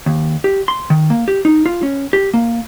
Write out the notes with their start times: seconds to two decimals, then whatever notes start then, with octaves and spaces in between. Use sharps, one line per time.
0.06 D#2
0.44 G4
0.68 C6
0.90 D#3
1.10 A#3
1.28 G4
1.45 D#4
1.66 F4
1.83 C#4
2.13 G4
2.34 A#3